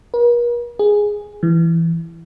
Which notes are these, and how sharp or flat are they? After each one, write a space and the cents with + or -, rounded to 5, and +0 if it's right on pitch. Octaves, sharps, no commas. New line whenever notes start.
A#4 +45
G#4 -5
E3 +10